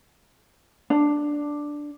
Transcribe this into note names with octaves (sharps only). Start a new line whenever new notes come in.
D4